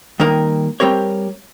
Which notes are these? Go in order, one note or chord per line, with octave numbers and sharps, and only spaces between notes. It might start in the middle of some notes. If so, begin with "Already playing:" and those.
D#3 G3 A#3 D#4 A#4
G3 C4 G4 A#4 C#5